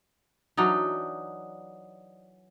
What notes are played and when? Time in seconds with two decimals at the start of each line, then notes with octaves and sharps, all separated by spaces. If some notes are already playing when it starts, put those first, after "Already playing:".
0.57 E3 F#3 D4 D#4